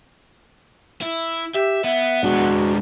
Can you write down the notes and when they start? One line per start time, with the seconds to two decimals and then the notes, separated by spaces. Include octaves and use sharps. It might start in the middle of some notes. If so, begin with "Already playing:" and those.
1.02 E4
1.55 G4 E5
1.84 B3 E5
2.24 G#3 D4 F#4